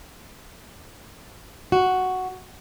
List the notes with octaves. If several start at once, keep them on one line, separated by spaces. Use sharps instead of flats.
F#4